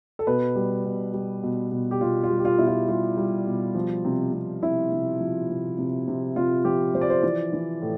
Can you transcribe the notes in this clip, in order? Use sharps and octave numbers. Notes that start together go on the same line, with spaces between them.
A4
B2 B4
G3
B2
G3
B2
B2
G4
B2 F4
F4
G3
G4
F4
B2 E4
F4
G3 F4
G3
B2
F3
C3
C3
C3 E4
C3
F3
C3
C3
C3
C3 F4
F3 G4
F3 C5
D5
C5
E3 D5
E3
A2